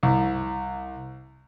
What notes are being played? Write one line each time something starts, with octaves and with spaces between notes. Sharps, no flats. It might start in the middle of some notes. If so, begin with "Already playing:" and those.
C2